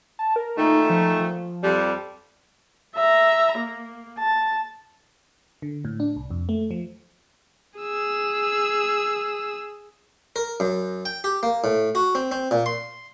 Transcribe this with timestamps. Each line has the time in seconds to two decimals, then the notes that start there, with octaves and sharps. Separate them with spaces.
0.19 A5
0.36 A#4
0.57 A#2 D#3 A3 D#4
0.90 F3
1.20 F3
1.62 F2 G3
2.95 E5 A#5
3.58 A#3
4.19 A5
5.62 D3
5.85 A2
6.00 D4
6.16 C2
6.31 F2
6.49 A3
6.71 F3
7.79 G#4 E6
10.36 A#4
10.60 F#2
11.05 G5
11.24 G4
11.43 A#3
11.64 A2
11.95 F#4
12.15 C4
12.32 C4
12.51 A#2
12.66 C6